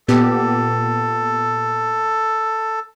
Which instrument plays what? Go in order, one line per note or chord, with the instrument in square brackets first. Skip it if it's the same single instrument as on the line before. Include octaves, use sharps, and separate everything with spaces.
[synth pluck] A#2 B3 G4 [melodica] A4